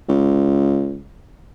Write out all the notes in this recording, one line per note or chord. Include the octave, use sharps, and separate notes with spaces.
C#2